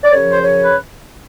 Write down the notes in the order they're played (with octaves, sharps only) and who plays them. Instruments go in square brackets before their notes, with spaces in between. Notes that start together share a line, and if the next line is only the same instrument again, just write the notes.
[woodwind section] D5
F#2 C#3 F3 C#5
C5
C#5
B4